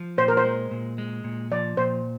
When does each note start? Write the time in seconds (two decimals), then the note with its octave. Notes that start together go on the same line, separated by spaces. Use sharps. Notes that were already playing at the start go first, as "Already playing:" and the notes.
Already playing: F3
0.18 A#2 C5
0.28 A#4
0.37 C5
0.45 G#3
0.71 A#2
0.98 G#3
1.24 A#2
1.52 F3 D5
1.77 A#2 C5